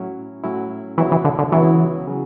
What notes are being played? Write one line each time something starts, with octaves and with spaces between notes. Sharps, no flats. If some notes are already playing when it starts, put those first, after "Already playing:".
Already playing: A2 F#3 C#4 E4
A2 F#3 C#4 E4
C#2 C#3 E3 F#3 B3 E4
E3
D3
D3
C#2 C#3 E3 F#3 B3 E4
C#3 F#3